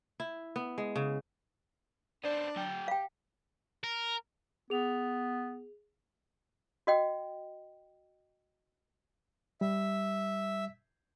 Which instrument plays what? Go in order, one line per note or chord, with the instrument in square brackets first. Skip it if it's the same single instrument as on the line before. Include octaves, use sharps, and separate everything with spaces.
[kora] E4
B3
G#3
C#3
[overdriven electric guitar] B3 C5 [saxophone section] D4 D5
[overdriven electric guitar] F#3 G5
[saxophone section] G4 [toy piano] F5 G5
[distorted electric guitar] A#4
[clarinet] B3 [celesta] G#4 F7
[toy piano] F#4 D#5 G5
[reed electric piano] G3 [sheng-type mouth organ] E5